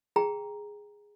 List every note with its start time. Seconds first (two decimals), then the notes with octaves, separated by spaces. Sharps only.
0.16 G#4 G5 A#5